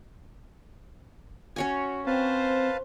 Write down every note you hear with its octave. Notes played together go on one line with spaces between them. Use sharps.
C#4 F#4 C#5 G#5
C4 B4 C5 F5 A5